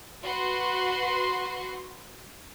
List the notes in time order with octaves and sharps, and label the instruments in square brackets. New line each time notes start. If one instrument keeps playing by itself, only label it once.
[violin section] F#4 B4 C6